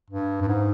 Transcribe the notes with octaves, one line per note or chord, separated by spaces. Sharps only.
G2
G2
G#2